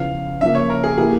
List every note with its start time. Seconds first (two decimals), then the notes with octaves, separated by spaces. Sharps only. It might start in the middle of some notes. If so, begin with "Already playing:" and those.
Already playing: E2 C#3 F3 F5
0.41 C#3 F3 A#3 E5
0.55 C#5
0.70 A#4
0.84 G#4
0.98 E3 A#3 E4 G4 G#4